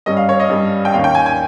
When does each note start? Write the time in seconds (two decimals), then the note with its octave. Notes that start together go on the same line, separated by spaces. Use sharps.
0.06 G2 G3 C#4 D#5
0.17 F5
0.29 C#5
0.40 D#5
0.50 G2 G3 C#4
0.85 G5
0.94 D#2 D#3 A#3 C#4 F5
1.04 G5
1.15 G#5
1.26 G#5